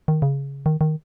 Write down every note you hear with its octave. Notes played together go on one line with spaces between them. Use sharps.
D#3
C#3
D#3
D#3